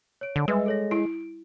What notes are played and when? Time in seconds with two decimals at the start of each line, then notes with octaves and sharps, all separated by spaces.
0.21 C#5 D7
0.36 D3
0.48 G3 G#3 B4 E5
0.66 A4 C#5 A#6
0.91 E4 D7